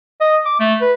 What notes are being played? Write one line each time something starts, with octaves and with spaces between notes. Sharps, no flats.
D#5
D6
A3
B4